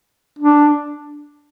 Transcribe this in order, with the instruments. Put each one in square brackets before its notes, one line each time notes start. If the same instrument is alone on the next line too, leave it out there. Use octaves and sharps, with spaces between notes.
[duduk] D4